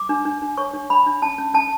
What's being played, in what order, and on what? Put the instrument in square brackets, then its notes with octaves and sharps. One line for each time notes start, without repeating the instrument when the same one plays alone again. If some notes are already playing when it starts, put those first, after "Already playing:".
Already playing: [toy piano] D6
D4
D4
D4
C#5 C#6
D4
D4 B5
D4
C#4 A5
C#4
C#4 A5